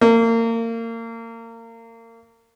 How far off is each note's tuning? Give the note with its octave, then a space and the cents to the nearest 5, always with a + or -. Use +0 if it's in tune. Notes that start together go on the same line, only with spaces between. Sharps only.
A#3 -30